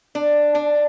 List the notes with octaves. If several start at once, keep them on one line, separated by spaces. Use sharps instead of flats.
D4
D4